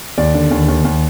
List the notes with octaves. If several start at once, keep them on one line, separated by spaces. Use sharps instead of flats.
D#2 D5
D3
D#2
D#2
D#2